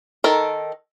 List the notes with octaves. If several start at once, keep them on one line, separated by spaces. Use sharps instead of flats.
D#3 A4 A#4